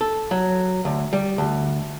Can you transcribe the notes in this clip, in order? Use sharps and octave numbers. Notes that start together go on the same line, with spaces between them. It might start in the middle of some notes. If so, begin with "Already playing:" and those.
A4
F#3
D2
G3
D2